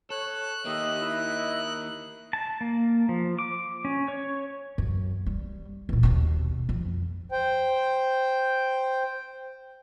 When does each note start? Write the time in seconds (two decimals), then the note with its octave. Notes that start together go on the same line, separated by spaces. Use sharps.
0.10 A4 C#5 F#6
0.65 D#3 A#3 G4 D#5 E5
1.01 E4
2.33 A5
2.61 A#3
3.09 F3
3.39 D6
3.85 C#4
4.08 C#5
4.78 F#2
5.26 G3
5.89 E2 A#2
6.03 D#2 B2
6.69 F2
7.32 C5 G5